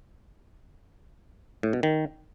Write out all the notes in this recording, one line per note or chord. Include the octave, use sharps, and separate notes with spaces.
A2
B2
D#3